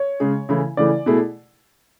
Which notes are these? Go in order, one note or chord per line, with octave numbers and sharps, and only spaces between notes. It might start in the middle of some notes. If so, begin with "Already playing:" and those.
Already playing: C#5
C#3 G#3 C#4 G#4
C#3 E3 A3 E4
C#3 E3 A3 E4 D5
B2 A3 E4 G#4